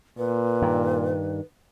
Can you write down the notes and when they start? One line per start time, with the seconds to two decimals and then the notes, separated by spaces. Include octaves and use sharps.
0.18 A#2 B4
0.62 G2 D#3